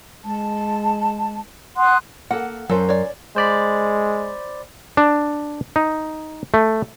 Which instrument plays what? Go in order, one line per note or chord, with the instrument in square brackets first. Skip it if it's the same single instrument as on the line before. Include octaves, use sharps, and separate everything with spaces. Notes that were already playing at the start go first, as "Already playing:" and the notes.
[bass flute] G#3 [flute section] A5
[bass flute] F#5 [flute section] C6 D#6 F#6
[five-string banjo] A#3 A4 [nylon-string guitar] F#5
[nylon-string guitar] F#2 C5 [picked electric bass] F#3 [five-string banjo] A4
[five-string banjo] C#5 D5
[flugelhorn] G#3 [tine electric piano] C5 D5 B5
[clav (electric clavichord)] D4
D#4
A3